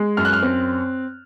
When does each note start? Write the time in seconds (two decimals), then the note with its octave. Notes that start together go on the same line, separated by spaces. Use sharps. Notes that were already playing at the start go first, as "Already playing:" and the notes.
Already playing: G#3
0.17 F#2 F6
0.25 F#6
0.33 F6
0.42 C4